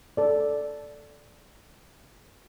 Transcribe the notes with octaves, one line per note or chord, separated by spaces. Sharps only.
A4 D5